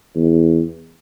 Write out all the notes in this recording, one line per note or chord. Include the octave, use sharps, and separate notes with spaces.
E2